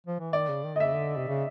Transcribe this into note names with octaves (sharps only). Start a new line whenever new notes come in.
F3
E3
D#3 D5
C#3
D#3
D3 D#5
C#3 E5
D3
C3
C#3